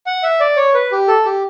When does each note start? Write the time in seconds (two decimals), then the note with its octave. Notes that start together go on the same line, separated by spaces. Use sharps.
0.06 F#5
0.23 E5
0.41 D5
0.57 C#5
0.74 B4
0.92 G4
1.08 A4
1.25 G4